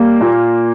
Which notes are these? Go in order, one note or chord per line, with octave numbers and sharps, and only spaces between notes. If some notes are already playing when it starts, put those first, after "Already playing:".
Already playing: G3 A#3
A#2